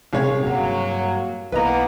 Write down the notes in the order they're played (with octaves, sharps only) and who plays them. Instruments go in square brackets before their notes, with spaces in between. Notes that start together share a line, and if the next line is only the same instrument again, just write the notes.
[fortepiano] C2 C#3 C#5 [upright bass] A#2 D#4
[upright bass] A1 G2 [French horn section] F#3 A#3
[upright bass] B1 [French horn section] E3 A#3 B3 [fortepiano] B4 D#5 A#5